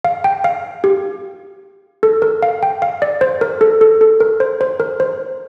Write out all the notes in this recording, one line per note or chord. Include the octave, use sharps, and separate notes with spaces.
F5
G5
F5
G4
A4
A#4
F5
G5
F5
D5
C5
A#4
A4
A4
A4
A#4
C5
C5
A#4
C5